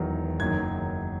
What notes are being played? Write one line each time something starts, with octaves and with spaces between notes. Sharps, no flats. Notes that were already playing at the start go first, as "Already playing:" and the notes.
Already playing: E1 E2 D#3 F#3
F#1 F#2 D#3 F#3 G#6